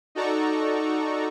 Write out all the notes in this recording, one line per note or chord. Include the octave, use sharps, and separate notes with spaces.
D#4 F#4 A4 D5 A#5 C#6